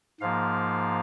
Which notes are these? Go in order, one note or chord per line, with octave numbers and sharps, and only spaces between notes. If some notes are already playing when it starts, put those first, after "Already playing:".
G#2 F3 A#3 F5